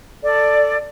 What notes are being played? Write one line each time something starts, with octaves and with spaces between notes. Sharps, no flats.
A4 D5